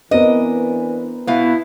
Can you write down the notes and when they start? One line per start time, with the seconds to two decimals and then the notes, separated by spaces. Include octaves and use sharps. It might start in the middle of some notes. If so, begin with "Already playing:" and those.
0.11 E3 B3 C4 D4 A#4 D#5
1.27 B2 B3 E4 F5